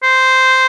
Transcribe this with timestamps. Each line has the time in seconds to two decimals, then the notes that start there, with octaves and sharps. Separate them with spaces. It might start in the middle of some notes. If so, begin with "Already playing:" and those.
0.03 C5